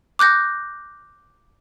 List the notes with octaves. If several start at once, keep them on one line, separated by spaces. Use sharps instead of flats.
D6 F#6 G6 A#6